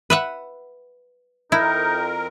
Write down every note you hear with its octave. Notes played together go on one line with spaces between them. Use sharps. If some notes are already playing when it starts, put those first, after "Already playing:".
B4 E5 F#5
F2 D#4 E4 A#4